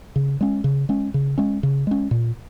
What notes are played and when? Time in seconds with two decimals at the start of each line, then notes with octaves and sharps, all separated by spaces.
0.16 C#3
0.41 G#3 C#4
0.64 C#3
0.89 G#3 C#4
1.14 C#3
1.38 G#3 C#4
1.63 C#3
1.87 G#3 C#4
2.11 A#2